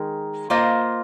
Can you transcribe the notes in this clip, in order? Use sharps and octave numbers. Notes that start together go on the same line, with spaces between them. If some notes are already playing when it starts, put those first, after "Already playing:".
Already playing: D#3 G#3
A#3 F4 C5 D#5